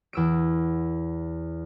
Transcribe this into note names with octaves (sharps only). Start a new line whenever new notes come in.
E2 E6 D7